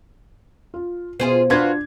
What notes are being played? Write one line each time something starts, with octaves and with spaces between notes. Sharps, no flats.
F4
B2 F4 G#4 C5
D4 F4 F#4 B4 G#6